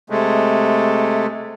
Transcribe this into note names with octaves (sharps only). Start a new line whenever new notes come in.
C3 G#3 A3